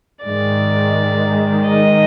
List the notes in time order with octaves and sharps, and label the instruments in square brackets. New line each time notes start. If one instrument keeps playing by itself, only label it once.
[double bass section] G#2 D#3 G#3 [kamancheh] D5
[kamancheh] D#5